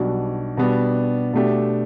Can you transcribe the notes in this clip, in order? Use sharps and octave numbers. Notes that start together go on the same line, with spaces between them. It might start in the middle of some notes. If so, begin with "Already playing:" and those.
Already playing: B1 B2 G3 D4 F#4
B2 G3 B3 D4
B2 A3 D4 G4